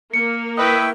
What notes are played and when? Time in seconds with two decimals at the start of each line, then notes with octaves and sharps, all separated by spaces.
0.13 A#3 C#7
0.58 E4 B4 D#5 E5 G5 C#6